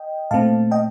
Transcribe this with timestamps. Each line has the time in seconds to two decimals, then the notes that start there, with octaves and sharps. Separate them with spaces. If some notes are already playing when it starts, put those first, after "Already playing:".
Already playing: D#5 G5
0.31 A#2 A3 C4 F5 A5
0.71 D#5 G5